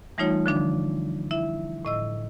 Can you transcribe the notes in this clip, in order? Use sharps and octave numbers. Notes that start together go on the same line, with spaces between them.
E3 G3 A3 D#4 F4 C#5
D3 F3 D4
E4 E5
A2 D#5 E6